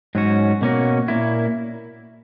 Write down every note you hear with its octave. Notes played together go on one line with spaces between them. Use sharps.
G#2 F#3 C#4 F#4
B2 A#3 C#4 F#4
A#2 A#3 E4